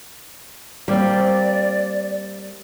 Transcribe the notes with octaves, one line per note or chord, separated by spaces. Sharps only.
G3 A#3 C4 D5